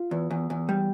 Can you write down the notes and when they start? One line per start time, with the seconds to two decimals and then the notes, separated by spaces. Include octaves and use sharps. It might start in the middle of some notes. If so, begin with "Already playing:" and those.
Already playing: F4
0.11 E2
0.31 E2
0.50 E2
0.69 G3